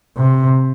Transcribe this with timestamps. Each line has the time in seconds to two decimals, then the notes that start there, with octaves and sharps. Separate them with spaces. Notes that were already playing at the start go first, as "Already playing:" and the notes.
0.17 C3